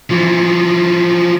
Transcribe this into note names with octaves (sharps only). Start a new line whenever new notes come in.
E3 F3